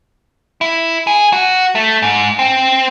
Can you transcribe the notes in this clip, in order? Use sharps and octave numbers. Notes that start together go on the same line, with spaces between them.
E4
G#4
F#4
A3
G#2
C4